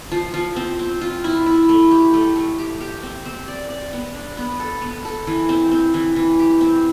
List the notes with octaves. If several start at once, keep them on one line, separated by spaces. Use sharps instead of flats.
F3
F3
C4
C4
F4
E4
E4
A3
G4
A3
A3
G4
G4
C4
C4
D5
D5
B3
D4
B3
A4
B3
A4
E3
C4
C4
E3
E3
G4
C4